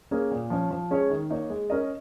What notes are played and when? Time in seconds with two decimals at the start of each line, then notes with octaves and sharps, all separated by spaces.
0.11 A#3 C#4 G#4
0.31 A#2
0.50 F3 C#4
0.71 F3
0.91 G#3 C#4 G#4 C#5
1.10 D#3
1.30 A#3 D#4 C#5
1.50 G#3
1.70 C#4 A#4 D#5